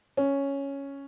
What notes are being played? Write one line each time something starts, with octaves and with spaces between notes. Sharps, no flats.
C#4